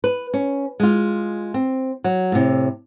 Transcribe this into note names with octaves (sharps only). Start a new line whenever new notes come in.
B4
C#4
G#3 F4
C4
F#3
A2 C3